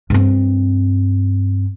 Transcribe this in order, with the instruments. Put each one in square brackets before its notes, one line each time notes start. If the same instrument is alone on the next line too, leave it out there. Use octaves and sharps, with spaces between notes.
[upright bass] G2 C4